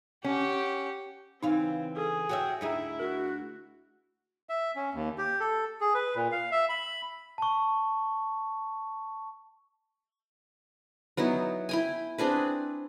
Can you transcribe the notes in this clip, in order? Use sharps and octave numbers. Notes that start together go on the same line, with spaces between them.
C#4 G4 F#5
C#3 E3 C4 D#4 F5
G#4 A4
F#4 C#5 E5 G5
D2 D#4 E4 G#4 E5
F#4 A#4
E5
C#4
D#2
G4
A4
G#4
B4
A#2
F5
E5
B5
A5 C#6
F#3 B3 D#4 E4
E4 G5 G#5
C4 D4 G#4 B4